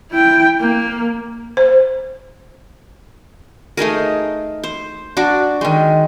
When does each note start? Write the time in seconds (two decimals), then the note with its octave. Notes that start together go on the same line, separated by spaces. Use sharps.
0.11 E4 G5
0.61 A#3
1.57 C5
3.77 A3 D#4 G#4 A#4
4.64 C5
5.17 D4 F#4 D6
5.61 D#3 G#3